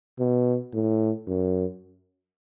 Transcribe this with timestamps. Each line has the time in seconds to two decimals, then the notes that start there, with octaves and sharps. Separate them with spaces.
0.19 B2
0.74 A2
1.27 F#2